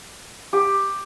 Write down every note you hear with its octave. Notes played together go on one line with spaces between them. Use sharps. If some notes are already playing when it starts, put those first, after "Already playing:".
G4